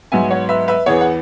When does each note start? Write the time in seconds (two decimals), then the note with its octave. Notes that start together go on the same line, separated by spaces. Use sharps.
0.12 G#2 F#3 B3 E5 G#5
0.31 C#5 F#5
0.49 B4 E5
0.68 B4 E5
0.86 E2 E3 B3 G#4 C#5
1.01 F#5